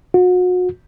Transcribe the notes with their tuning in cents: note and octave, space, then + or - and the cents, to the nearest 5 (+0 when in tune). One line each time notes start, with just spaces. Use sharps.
F#4 -35